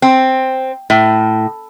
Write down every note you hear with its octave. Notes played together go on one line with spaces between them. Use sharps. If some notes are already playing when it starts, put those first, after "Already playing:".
C4
A2